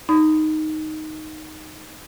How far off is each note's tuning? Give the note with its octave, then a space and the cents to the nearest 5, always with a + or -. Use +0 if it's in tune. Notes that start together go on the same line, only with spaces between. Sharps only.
D#4 +0 B5 +35